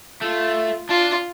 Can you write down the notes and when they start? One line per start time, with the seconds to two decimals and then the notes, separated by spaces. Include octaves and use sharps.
0.21 A3 F4
0.89 D4 F4